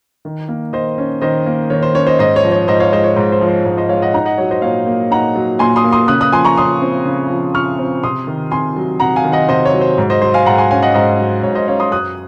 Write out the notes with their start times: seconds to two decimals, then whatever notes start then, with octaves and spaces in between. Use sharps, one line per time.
0.25 D#3
0.49 A#3
0.73 D#3 C5 D#5
0.98 C#4
1.21 D#3 C5 D#5
1.46 A#3
1.70 D#3 C#5
1.83 C5
1.95 C#4 C#5
2.07 C5 D#5
2.19 G#2 C5 D#5
2.36 C#5
2.44 F3
2.52 C#5
2.68 G#2 C5 D#5
2.80 C#5 F5
2.92 G#3 C5 D#5
3.04 C#5
3.16 G#2 C5
3.32 C5
3.41 F3
3.49 C5
3.65 G#2 C#5
3.78 C5 D#5
3.89 G#3 C#5 F5
4.02 D#5 F#5
4.14 D#4 F#5 A#5
4.26 D#5 F#5
4.38 F#3 C#5
4.51 C5 D#5
4.62 A#2 C#5 F5
4.86 A#3
5.11 D#4 F#5 A#5
5.36 F#3
5.59 A#2 G#5 C6
5.76 C6 D#6
5.84 A#3
5.92 C6 D#6
6.08 C#3 D#6 F#6
6.21 D#6 F#6
6.32 F3 G#5 C6
6.45 A#5 C#6
6.57 C#3 C6 D#6
6.82 C4
7.05 C#3
7.30 F3
7.54 C#3 C#6 F6
7.79 C4
8.03 C3 C6 D#6
8.27 D#3
8.51 C3 G#5 C6
8.76 F#3
9.00 C3 F#5 A#5
9.16 F5 G#5
9.24 D#3
9.32 D#5 F#5
9.49 C3 C5 D#5
9.65 C#5
9.73 F#3
9.81 C5
9.98 G#2
10.10 C5 D#5
10.22 F#3 C5
10.34 F5 G#5
10.46 G#2 F#5 A#5
10.58 G#5 C6
10.71 C#4 F5 G#5
10.82 D#5 F#5
10.94 G#2 C5 D#5
11.19 F#3
11.43 G#2 C#5
11.55 C5 D#5
11.68 C#4 C#5 F5
11.80 C6 D#6
11.92 F#2 D#6 F#6